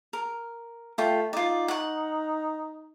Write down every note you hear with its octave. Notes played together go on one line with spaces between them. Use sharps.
A#4
A3 F4 G5
D#4 F4 D5
F#5 C#6